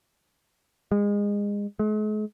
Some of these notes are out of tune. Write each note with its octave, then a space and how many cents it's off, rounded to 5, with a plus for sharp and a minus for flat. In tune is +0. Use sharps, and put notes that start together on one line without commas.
G#3 -25
G#3 +45